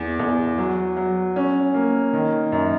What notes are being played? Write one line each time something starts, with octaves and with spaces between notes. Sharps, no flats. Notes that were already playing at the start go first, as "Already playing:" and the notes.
Already playing: E2
E2
F#3
F#3
C#4
A#3
D#3
F#2